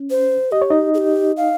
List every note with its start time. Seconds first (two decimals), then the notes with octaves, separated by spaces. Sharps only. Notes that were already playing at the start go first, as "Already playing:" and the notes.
Already playing: C#4
0.10 C5
0.52 G4 D#5
0.62 C#5
0.70 D#4 D#5
0.94 G#4
0.98 G4
1.37 F5